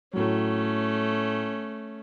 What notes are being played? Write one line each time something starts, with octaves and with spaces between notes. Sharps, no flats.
A2 F#3 A3 C#4